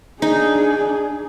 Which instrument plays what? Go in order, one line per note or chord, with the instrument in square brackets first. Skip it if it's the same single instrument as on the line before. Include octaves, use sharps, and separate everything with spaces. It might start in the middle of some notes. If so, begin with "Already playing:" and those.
[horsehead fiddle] D4 G#4 [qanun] D#4